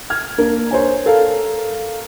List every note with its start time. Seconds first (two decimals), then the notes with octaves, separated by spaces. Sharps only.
0.10 F6 G#6
0.38 A#3 D4 A#4
0.71 C5 C#5 G#5
1.06 A4 A#4 F5